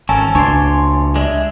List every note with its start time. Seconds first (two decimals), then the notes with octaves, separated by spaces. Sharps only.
0.09 G#1 C#4 A4 A#4 G#5 A5
0.35 C#2 D4 C#5 D5 C6
1.16 G#3 D5 E5